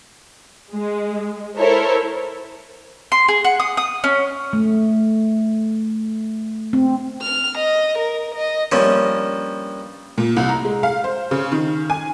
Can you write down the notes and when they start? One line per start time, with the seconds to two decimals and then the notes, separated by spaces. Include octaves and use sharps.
0.73 G#3
1.58 E4 A4 A#4 C5 C#5
3.12 C6
3.28 G#4
3.44 F#5
3.60 D#6
3.77 D#6
4.04 C#4
4.53 A3
6.73 C4
7.22 F6
7.58 D#5
7.98 A#4
8.35 D#5
8.72 G2 F3 A#3 C#4
10.18 A#2
10.37 C2
10.49 A#5
10.65 G#3
10.83 F5
11.04 C5
11.31 C#3
11.52 D#3
11.90 G#5